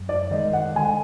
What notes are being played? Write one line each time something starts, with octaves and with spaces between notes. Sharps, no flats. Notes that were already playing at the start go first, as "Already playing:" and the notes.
Already playing: F#2
D5
D#3 G#3 D#5
F#5
D3 G#5